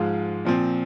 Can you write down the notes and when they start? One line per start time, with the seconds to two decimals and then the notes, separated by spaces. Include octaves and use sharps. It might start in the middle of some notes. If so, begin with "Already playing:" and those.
Already playing: G#2 F3 G#3 F5
0.45 A#2 F3 C4